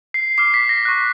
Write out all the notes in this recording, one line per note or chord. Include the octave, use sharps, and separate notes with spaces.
C7
D6 F6 C7
B6
A#6
C#6 F#6